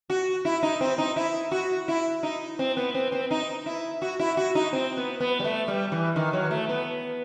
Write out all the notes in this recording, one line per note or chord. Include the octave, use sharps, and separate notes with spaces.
F#4
E4
D#4
C4
D#4
E4
F#4
E4
D#4
C4
B3
C4
C4
D#4
E4
F#4
E4
F#4
D#4
C4
B3
B3
G3
A3
G3
E3
D#3
F#3
A3
B3